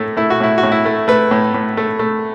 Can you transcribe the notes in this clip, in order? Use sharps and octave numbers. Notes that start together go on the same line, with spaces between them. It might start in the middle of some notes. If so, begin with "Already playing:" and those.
Already playing: A2 A3
A3 E4
F#4
A2 E4
F#4
A2
E4
A3
A3 B4
A2
A2
A3
A3